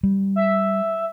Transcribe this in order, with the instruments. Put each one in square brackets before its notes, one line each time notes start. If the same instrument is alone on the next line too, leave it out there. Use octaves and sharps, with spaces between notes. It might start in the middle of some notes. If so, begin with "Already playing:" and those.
[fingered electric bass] G3
[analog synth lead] E5